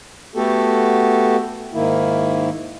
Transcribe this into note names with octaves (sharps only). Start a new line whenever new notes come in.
A3 B3 F#4 G4 A4
G#2 D#3 A#3 E4